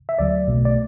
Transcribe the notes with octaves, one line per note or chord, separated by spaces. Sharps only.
E5
D2 D3 F#3 D5
B1 B2 A3
D5